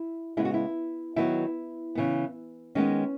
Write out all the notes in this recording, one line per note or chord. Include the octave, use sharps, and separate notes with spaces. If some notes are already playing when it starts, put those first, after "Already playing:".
Already playing: E4
C#3 G#3 B3 E4
F#4
E4
D#3 F#3 B3 E4
C#3 E3 B3
D#3 G#3 B3 C#4